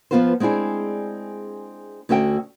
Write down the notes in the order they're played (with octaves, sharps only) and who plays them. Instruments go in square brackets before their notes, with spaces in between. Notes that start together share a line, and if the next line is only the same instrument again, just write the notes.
[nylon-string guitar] F3 A#3 B3 F4 B4 C5
G#3 C4 D4 E4 G#4
D2 C#4 F#4 A4 E5 G5